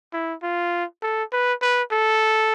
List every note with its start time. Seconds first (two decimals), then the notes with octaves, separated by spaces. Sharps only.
0.13 E4
0.43 F4
1.03 A4
1.33 B4
1.62 B4
1.92 A4